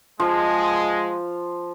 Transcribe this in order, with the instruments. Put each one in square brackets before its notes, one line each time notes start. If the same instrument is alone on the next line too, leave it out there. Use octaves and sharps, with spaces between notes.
[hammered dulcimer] F3 [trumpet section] G#3